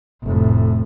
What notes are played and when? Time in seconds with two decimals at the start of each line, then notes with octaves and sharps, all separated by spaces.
0.24 F1 A2